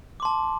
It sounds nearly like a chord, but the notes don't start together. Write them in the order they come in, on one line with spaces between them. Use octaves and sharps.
D6 C6 A5